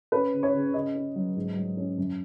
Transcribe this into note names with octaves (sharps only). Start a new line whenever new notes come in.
C#4 B4
C#3
C#5
C#3
C#3 D#5
C#4
F#3
G#2
F#3
C#4
F#2